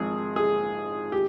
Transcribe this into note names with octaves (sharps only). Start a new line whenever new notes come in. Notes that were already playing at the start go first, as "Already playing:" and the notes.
Already playing: G#1 G#2 F3 C4 G#4
G#4
G4